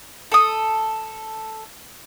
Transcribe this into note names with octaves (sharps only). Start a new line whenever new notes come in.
A4 D#6